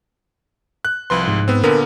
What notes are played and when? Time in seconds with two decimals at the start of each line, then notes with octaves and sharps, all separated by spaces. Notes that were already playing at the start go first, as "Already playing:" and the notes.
0.85 F#6
1.10 C2 F3 B4 C6
1.27 G#2
1.48 B3 C4
1.63 A#2 D3 B3 A#4